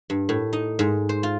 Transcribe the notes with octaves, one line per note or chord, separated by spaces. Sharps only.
G2
A2
D#4
G#2
C5
F4